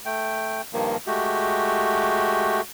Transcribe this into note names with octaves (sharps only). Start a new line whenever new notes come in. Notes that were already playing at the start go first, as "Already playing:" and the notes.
A3 G5
G2 D#3 F3 A#3
G#3 A3 F#4 G4